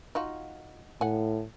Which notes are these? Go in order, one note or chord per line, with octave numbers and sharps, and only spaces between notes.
D#4 F4 F#4
A2 F#5 G#5